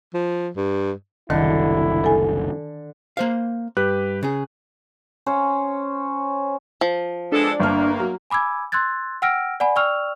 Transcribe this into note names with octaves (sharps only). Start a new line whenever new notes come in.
F3
G2
F#1 C2 D3 D#3 E4
A4 G#5
A#3 C5 F5
G2 G4 B4 F#6
C#3 G#4
C#4 C5
F3
G#3 B3 D4 A4
G1 A#3 F6
F#3
G#5 B5 D6 E6 G#6
C6 E6 F#6 G#6 A6
F#5 G5 E6 F6 A#6 D7
D5 F#5 G#5 B5
D5 G5 C#6 E6 F6 F7